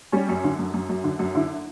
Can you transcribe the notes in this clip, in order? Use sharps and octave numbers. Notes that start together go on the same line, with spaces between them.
G3 C#4
F#2
D3
F#2
F#2
F#2
D3
F#2
D3 E4